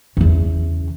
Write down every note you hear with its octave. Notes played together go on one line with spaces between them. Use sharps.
E2 C#3